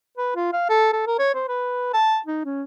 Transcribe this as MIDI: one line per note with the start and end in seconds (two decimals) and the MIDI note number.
0.17 0.32 71
0.36 0.53 65
0.53 0.69 77
0.69 0.91 69
0.93 1.06 69
1.07 1.17 70
1.19 1.33 73
1.35 1.43 72
1.48 1.89 71
1.94 2.18 81
2.26 2.42 63
2.45 2.63 61